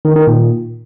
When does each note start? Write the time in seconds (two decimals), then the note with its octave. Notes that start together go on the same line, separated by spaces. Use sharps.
0.05 D#3
0.16 D#3
0.27 A#2